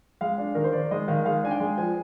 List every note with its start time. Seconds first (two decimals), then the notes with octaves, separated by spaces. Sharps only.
0.21 G#3 F5
0.38 D4
0.55 D#3 A#4
0.64 C5
0.73 D#3 D5
0.91 G#3 D#5
1.08 D#3 F5
1.25 G#3 F5
1.43 D4 G#5
1.51 G5
1.60 G#3
1.77 F3 G#5